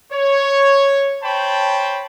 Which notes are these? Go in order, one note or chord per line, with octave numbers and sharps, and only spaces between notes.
C#5
C5 C#5 G5 A5 B5